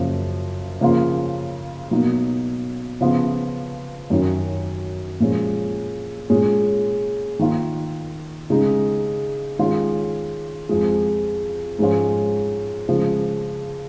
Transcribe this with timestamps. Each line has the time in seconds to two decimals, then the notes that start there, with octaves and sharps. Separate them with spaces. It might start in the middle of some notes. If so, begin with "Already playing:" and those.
Already playing: F#2 C#3 F3 A#3
0.81 C#3 F3 A#3 C#4 F4
1.91 B2 F#3 A#3 D#4
3.01 C#3 F3 B3 F4
4.10 F#2 D#3 F#3 C#4
5.20 A#2 F3 G#3 C#4
6.30 A#2 G#3 C#4
7.39 D#3 A#3 F4
8.50 C#3 G#3 D#4
9.59 D#3 G#3 C#4 F4
10.69 F2 F3 G#3
11.79 G#2 F3 G#3 C#4 F4
12.88 C#3 F3 G#3